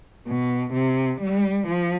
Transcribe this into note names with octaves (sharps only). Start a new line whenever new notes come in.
B2
C3
G3
F3